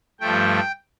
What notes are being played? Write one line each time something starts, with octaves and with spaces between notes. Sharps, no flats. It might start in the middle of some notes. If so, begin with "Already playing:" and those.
G2 F3 A3 G5